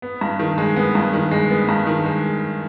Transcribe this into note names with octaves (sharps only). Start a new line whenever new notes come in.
B3
G2
D#3
G#3
B3
G2
D#3
G#3
B3
G2
D#3
G#3